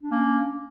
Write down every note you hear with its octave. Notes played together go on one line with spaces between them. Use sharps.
A#3 C#4 D4